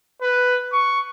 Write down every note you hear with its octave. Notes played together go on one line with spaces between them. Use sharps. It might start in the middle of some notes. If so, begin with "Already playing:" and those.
B4
C#6